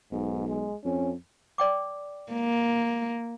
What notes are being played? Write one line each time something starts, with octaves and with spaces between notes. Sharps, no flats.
B1 G#2
G#3
F2 C#4
D5 G5 D6
A#3